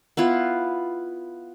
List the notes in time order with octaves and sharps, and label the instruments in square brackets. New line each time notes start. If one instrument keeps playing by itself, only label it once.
[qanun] B3 E4 F4